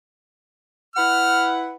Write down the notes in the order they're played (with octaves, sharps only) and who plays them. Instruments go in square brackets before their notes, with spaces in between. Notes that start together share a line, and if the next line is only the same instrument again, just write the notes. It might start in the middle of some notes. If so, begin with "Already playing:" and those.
[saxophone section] E4 B4 F#5 [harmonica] F6